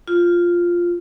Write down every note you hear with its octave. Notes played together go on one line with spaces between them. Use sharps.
F4